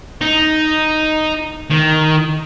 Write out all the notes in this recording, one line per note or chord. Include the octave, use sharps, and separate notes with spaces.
D#4
D#3